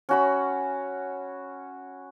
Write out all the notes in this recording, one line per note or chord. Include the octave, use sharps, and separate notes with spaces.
C#4 F#4 B5